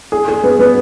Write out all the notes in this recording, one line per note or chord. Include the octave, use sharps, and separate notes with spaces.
G#4
G#4
B3
B3